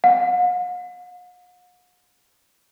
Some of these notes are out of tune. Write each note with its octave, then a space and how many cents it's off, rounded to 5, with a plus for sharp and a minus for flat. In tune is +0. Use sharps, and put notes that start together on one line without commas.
F#5 -45